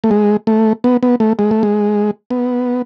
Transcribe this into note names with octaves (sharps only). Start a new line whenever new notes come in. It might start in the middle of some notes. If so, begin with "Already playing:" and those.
A3
G#3
A3
B3
B3
A3
G#3
A3
G#3
B3